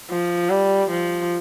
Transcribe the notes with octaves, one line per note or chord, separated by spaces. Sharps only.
F3
G3
F3